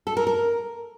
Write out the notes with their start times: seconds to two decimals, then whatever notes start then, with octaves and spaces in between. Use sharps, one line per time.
0.07 A4
0.17 A#4
0.27 A#4